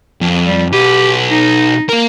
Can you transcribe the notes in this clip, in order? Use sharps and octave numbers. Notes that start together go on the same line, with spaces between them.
F2
G3
B1 G4 B4
D#4
A#3 A#4